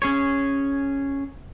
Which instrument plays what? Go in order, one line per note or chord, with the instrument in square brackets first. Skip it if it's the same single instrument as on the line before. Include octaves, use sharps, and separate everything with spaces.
[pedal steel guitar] C#4 G#4 C#5